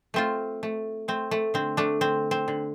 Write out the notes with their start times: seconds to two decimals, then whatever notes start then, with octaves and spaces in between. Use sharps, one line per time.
0.14 A3 C4 F4
0.63 A3
1.08 A3 C4
1.31 A3
1.54 D3 C4
1.77 A3 D4
2.01 D3 C4
2.31 C4
2.48 D3